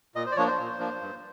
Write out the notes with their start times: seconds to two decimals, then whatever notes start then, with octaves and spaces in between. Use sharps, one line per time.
0.15 A#2 D#5
0.26 C5
0.32 D5
0.36 F3 A#3 D4 C#5
0.47 C5
0.58 A#2
0.79 F3 A#3 D4
1.01 G2